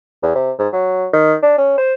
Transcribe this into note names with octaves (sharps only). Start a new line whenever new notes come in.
E2
C3
G#2
F#3
D#3
D4
C#4
C5